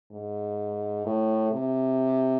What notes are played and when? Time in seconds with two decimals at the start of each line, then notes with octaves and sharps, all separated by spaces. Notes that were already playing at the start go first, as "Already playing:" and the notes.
0.12 G#2
1.06 A2
1.53 C3